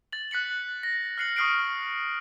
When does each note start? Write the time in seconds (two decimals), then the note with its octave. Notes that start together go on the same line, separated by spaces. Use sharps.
0.12 A6 F#7
0.31 F#6 B6 C#7 F#7
0.83 A#6
1.18 F6 F#6 C7 C#7 F#7
1.36 C#6 D#6 F6 C7 D7